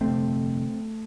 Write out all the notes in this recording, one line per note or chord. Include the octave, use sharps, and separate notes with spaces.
G1 F2 C3 A3 C4